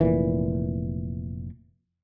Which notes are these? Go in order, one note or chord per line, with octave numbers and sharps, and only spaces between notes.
F1 A#2 E3